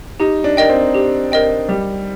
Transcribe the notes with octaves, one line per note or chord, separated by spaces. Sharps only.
D#4 G4
D4
A#4 D#5 G5
C4
G4
A#4 D#5 G5
G3 G4